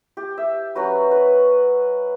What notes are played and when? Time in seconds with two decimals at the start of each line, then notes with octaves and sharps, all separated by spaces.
0.17 G4
0.38 E5
0.75 F#3 C#4 F#4 B4
1.11 B4